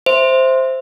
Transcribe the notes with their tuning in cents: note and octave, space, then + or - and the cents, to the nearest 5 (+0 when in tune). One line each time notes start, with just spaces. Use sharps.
C5 +0 E5 +0